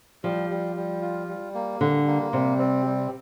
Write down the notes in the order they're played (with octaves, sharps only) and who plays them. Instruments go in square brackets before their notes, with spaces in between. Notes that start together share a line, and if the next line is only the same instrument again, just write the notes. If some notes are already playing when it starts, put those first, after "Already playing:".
[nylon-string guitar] F3 [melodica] G3
[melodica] G3
G3
F4
G3
A#3
[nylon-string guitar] D3 [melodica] G3
[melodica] A#3
[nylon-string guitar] C3 [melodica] G3
[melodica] C4
G3